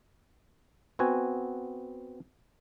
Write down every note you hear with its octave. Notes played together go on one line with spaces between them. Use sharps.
B3 C4 F#4 G#5